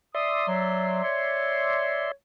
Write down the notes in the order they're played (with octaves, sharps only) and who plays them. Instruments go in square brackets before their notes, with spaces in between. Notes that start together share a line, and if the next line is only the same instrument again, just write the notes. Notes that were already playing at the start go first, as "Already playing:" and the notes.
[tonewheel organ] D5 E5 C6 [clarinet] D#6
[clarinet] F#3
C#5